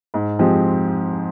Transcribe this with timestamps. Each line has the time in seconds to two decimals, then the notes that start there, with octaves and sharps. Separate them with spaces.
0.14 G#2
0.39 F3 G#3 C4 G4